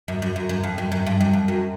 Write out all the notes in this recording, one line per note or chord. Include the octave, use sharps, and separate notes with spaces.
F#2
F#2
F#2
F#2
F2
F#2
F#2
G2
F#2
F2
F#2